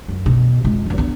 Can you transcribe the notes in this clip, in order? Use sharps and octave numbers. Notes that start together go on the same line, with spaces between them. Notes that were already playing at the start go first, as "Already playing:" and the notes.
F#2
B2
F2 G#3
D2 G2
B3 D4